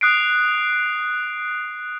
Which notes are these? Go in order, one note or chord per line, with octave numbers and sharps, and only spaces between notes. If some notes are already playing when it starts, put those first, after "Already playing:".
D#6 F#6 C7 D7